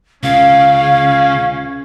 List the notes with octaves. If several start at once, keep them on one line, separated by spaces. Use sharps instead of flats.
C#2 C#3 C#4 F5